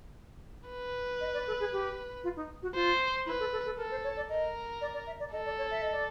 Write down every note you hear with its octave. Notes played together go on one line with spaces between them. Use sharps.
B4
D#5
D5
A4
G#4
G4
F4
D#4
F#4
F4 C5
E4 B4
A4
A4
A4
A4 A#4
C5
C#5
D5
A#4 D#5
D5
D5
E5
D5
A4 D#5
D5
C#5
E5
D#5
D5